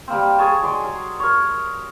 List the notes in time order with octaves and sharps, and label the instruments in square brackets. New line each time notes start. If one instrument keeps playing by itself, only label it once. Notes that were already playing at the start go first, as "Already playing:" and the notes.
[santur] G3 A#3 C4
G#4 A#4 C#5 A5
F#3 G#3 D5 C6
F#3
A#4 C#5